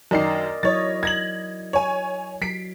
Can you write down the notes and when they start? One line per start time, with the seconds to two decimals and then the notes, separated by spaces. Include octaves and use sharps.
0.11 F#2 D#3 A#4 D5 D#5 C7
0.63 F#3 E4 C#5 D#5 A6
1.03 G#6 A#6 F#7
1.73 C#5 G#5
2.42 F#3 B6 C7 D7